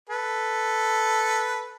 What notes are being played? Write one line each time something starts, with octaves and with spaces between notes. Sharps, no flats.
A4 B4